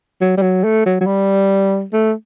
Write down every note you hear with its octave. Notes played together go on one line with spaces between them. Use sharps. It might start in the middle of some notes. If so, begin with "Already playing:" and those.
F#3
G3
F#3
A3
F#3
F#3
G3
A3